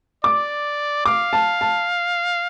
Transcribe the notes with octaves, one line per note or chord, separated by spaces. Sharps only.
D5 D6
F5 D6
A5
A5